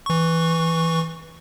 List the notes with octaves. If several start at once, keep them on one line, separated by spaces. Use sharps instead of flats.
E3 C#6